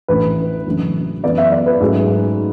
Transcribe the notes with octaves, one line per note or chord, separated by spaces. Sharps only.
A1 A2 E3 A3 D4 B4
F#1 F#2 E3 A3 D4
F#2 E3 B3 D5
E5
D5
B4
G#2 F#3 A3 C#4